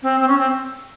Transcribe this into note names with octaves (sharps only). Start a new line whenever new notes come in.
C4
C4
C#4
C4